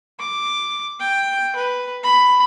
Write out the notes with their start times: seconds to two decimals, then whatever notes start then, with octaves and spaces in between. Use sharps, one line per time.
0.20 D6
1.00 G5
1.55 B4
2.03 B5